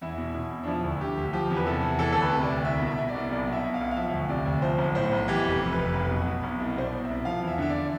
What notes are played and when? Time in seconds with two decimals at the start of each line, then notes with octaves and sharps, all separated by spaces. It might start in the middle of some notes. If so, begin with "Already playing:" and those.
0.01 E2 E4
0.18 B2
0.34 B2
0.51 E2
0.63 D4
0.67 F3 E4
0.84 D2
1.01 D3 G4
1.17 D2
1.33 F3 G4
1.50 E2
1.56 B4
1.66 C3 A4
1.82 E2
1.99 E3 A4
2.12 D2 A4
2.22 B4
2.32 C3
2.43 D5
2.48 D2
2.64 C2 E5
2.82 B2 E5
2.98 B2
3.09 D5
3.15 C2
3.30 B1 D5
3.47 B2
3.53 E5
3.63 B2
3.74 F5
3.80 B1
3.91 F5
3.96 F3 E5
4.12 D2
4.29 C3 D5
4.46 D2
4.62 F3 C5
4.78 B1
4.95 A2 C5
5.11 B1
5.28 E3 G4
5.45 F1
5.50 G4
5.61 F2
5.72 F1 B4
5.94 B1
6.11 B2
6.27 B2
6.43 B1
6.60 C2
6.76 B2 C5
6.82 D5
6.92 B2
7.04 E5
7.09 C2
7.25 F3 F5
7.42 E2
7.47 E5
7.58 D3 E5
7.70 D5